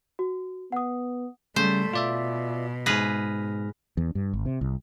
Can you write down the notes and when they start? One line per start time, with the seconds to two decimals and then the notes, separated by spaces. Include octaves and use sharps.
0.19 F#4
0.72 B3 F#5 D#6
1.56 C#3 G3 A3 C5
1.93 B2 F4 D5 E5
2.86 G#2 G#4 B4 F6 A#6
3.97 E2
4.15 G2
4.33 G#1
4.46 C3
4.61 C2